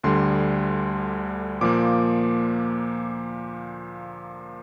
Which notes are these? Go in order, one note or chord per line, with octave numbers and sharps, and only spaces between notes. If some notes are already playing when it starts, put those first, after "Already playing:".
D2 D3 G3 C6
A#2 F3 A#3 D6